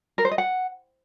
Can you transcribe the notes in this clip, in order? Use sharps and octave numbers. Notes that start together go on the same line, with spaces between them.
A#4
C5
D#5
F#5